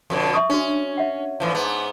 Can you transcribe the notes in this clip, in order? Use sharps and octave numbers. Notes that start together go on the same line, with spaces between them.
F2 B2 D3
E5 C#6 D#6
C#4 D4 F#4
E5 F#5
A2 E3 F3
G#2 B3